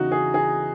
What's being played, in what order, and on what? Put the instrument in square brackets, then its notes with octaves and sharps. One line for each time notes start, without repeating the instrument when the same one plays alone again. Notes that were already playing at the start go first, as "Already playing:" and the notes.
Already playing: [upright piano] E2 C#3 E3 D#4 F#4
G#4
G#4